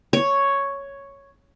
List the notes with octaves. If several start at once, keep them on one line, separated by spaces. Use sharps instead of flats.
C#5